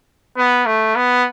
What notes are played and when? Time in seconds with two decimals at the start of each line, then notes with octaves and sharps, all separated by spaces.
0.37 B3
0.66 A3
0.96 B3